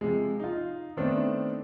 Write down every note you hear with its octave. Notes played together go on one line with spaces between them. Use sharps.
C3 F3 G#3
D#4 F4
D#3 A3 B3 C4 D4